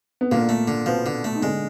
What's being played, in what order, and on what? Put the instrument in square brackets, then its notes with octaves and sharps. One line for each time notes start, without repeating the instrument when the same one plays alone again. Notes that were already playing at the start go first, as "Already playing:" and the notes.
[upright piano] B3
[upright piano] A#2 A#3 [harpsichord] D3
[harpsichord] A3
D3
[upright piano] B2 B3 [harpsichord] F3
[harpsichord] D3
A3
[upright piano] D#4
[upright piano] D3 D4 [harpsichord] G#3